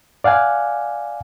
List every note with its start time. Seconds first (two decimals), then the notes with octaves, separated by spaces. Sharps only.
0.24 D5 F5 F#5 G#5